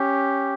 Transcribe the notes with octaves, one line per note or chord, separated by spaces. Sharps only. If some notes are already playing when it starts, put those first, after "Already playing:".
Already playing: C#4 G4